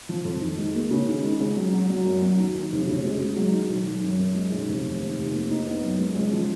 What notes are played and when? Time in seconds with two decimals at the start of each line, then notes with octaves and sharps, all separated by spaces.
0.09 F3
0.25 F2
0.41 D#3
0.58 G#3
0.74 A#3
0.91 C#3
1.06 D#3
1.23 G#3
1.40 C#2
1.56 F#3
1.73 F#3
1.90 F#3
2.06 F#2
2.22 F#3
2.38 D#2
2.54 D#3
2.72 F1
2.87 C#3
3.04 G#3
3.21 G#3
3.36 F#3
3.53 D#3
3.69 B1
3.86 B1
4.03 F#2
4.19 F#2
4.35 G#3
4.52 B1
4.68 F1
4.85 D#2
5.01 D#2
5.18 F1
5.33 A#3
5.51 D#4
5.66 B3
5.83 F#2
5.99 G#3
6.15 C#2
6.33 F3